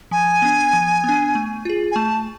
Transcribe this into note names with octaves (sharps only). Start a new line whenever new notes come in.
F3 G#5
B3 D4
F3
B3 D4
A3
F4 G#4
G#5
A3 A5